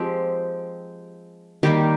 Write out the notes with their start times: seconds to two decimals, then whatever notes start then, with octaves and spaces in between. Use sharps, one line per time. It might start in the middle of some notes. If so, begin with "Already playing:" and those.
Already playing: F3 G#3 C4 G4
1.63 D#3 G3 A#3 G4